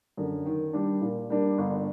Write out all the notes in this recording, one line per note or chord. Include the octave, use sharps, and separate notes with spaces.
F#2 D3
D#3
G3 D4
A#2
G3 A#3 D4
G1